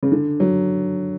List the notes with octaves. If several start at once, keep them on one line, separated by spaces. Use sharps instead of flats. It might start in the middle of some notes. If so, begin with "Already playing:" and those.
C#3
D3
F#3